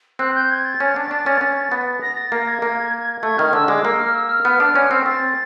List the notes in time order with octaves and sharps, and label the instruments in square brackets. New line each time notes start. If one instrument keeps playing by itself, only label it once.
[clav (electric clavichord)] C4 [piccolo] F#6
[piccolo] G6
G#6
A6
[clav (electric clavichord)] C#4
D4
D4
C#4
C#4
B3
[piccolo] A#6
A6
[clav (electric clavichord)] A#3 [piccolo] A#6
[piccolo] G#6
[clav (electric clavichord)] A#3
[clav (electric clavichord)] A3 [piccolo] G#6
[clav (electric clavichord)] D#3 [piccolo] F6
[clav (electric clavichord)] D3 [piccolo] E6
[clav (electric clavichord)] G#3 [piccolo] D6
[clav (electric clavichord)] A#3 [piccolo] E6
[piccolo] F6
E6
F6
[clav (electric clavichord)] B3
D4
C#4
C4
[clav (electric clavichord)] C4 [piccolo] A6